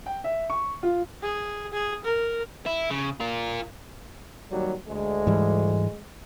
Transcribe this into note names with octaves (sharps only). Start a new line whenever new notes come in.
G5
E5
C#6
F4
G#4
G#4
A#4
E4
C#3
F4 A#4
D#2 F#3 G3
D2 G#3
G#2 E3 G3